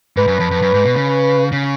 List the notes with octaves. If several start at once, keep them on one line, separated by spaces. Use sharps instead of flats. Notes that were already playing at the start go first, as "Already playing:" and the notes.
G#2 B4
F#2
F2
F2
F#2
G#2
B2
C#3
C#3